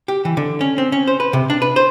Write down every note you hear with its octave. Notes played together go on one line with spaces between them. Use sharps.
G4
E3
D3
C#4
C4
C#4
C5
B4
C3
D4
B4
C5